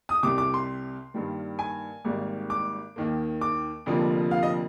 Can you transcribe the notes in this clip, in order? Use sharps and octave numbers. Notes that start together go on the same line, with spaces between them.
D#6
C2 C3 G3 D6
D6
C6
G2 D#3 G3 A#3
G#5
G#1 G#2 G3 A#3
D6
D#2 D#3 A#3
D6
F1 F2 D3 F3 A#3
F5
D#5